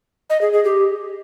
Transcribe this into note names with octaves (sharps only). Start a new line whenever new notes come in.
D#5
G#4
G#4
G4